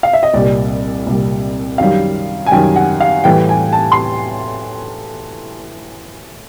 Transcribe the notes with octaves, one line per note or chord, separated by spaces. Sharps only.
F5
E5
D#5
C2 A#2 G3 D5
C2 A#2 G3
F#2 D#3 G3 F5
G#5
F#2 D#3 G3 G5
F#5
F5
A2 E3 G3 G5
G#5
A5
C6